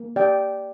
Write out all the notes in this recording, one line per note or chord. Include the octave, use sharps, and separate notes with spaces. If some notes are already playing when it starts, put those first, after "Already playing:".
Already playing: A#3
G4 D5 G5